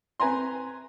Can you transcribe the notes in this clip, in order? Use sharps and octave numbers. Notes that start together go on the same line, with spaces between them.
C4 B4 G#5 A#5 C6